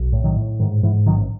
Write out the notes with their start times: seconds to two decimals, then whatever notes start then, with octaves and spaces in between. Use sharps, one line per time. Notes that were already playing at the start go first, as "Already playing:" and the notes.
Already playing: B1
0.13 A2
0.24 D#3 F#3
0.36 A2
0.59 G#2 D#3
0.83 G#2 E3
1.06 A1 D#3 F#3